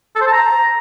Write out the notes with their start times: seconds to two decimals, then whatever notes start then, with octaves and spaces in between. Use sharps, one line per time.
0.16 A4
0.21 C5
0.27 A5
0.32 A#5